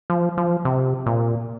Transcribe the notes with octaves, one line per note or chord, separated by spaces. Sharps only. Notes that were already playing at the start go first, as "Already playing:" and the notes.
F3
F3
C3
A#2